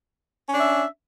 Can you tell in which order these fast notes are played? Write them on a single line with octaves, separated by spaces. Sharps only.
C#4 D4 E5